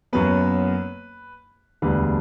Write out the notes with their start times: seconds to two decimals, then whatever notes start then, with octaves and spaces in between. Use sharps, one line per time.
0.13 F#1 F#2 F#3 B3 B4
1.82 E1 D2 D3 G3 B4